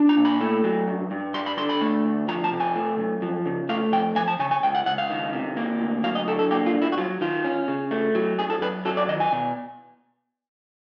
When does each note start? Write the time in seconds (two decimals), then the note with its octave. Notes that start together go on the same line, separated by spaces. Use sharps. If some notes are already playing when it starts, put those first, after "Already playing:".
Already playing: D4
0.09 A#5
0.17 A#2
0.25 B5
0.41 A3
0.64 F#3
0.87 G2
1.11 G2
1.34 G3 C6
1.46 B5
1.58 D3 C6
1.69 B5
1.81 A3
2.05 D2
2.28 F3 A#5
2.44 A5
2.52 C3
2.60 G#5
2.75 A3
2.99 F#2
3.22 F3
3.46 C#3
3.69 A3 F5
3.92 F2 G5
4.16 F3 G#5
4.28 A5
4.39 C#3 G#5
4.51 G#5
4.63 C#2 G5
4.75 F#5
4.86 C#2 F#5
4.98 F5
5.10 D#3
5.33 C3
5.57 A#3
5.81 D2
6.04 F#3 F5
6.15 D#5
6.27 D3 A4
6.39 A4
6.51 A#3 G4
6.66 F4
6.74 G2
6.82 E4
6.92 F#4
6.97 F#3 F4
7.21 D#3 F4
7.44 C#4
7.68 C#3
7.91 A3
8.15 F#3
8.38 F#2 G#4
8.50 A4
8.62 F#2 B4
8.85 F#3 A4
8.97 D5
9.09 D#3 D#5
9.20 G#5
9.32 B2